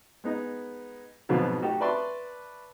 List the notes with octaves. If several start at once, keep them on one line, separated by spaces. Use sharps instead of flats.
G#3 B3 D#4
F2 G#2 B2 F3 F#3
A3 D#4 F#4 G4 A4
B4 D5 E5 A5 C6 C#6